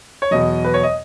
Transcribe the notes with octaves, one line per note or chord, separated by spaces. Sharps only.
C#5
E2 B2 F#3 D#5
B4
C#5
D#5